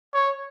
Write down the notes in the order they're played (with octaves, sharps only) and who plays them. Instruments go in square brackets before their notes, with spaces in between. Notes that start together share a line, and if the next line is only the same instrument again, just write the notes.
[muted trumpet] C#5